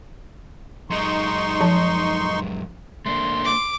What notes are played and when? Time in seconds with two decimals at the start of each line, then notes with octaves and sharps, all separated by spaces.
0.90 F#2 G#3 D#4 C6 C#6
1.61 F3 A5
3.06 A3 A#3 D4 C6
3.44 D6